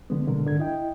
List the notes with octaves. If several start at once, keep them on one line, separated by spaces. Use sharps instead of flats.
D3 G#3 B3
B2 D3 G#3 A#4
G#2 D3 G#6
E4 D#5 G5